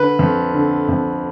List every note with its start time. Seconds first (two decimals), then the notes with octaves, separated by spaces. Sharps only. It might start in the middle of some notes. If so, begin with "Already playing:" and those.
Already playing: D3 B4
0.19 F2
0.54 D3
0.89 F2